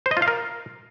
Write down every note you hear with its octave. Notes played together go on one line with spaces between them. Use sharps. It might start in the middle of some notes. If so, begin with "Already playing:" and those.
C5
D#5
F4
F5
A#4